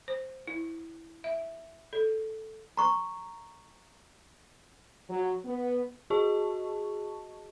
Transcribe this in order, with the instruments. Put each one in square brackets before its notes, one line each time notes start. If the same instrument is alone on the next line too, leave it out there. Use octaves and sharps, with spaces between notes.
[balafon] C5
E4
E5
A4
[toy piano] A#5 C#6
[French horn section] F#3
B3
[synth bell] F#4 G#4 D#5 A5 C#6